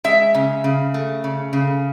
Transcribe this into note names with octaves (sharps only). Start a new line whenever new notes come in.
G#3 E5
C#3
C#3
A3
C#3
C#3